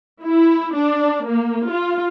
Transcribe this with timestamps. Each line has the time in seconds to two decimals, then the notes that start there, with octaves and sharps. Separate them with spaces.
0.24 E4
0.75 D4
1.27 A#3
1.69 F4